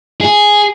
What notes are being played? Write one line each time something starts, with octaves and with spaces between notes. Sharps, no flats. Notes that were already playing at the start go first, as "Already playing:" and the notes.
G#4